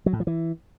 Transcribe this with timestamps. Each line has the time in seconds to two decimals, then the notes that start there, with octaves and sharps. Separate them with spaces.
0.06 F#3
0.13 A2
0.20 F3
0.27 E3